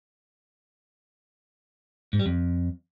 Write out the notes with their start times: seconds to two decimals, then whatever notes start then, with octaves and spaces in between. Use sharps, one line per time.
2.13 G#2
2.19 G3
2.26 F2